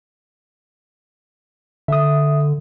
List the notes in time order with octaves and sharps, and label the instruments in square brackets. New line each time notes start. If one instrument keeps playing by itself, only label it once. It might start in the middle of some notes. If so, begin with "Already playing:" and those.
[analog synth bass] D3 [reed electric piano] E5 D#6